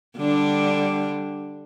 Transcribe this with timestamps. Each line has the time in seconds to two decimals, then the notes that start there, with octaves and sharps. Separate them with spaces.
0.17 D3 G3 D4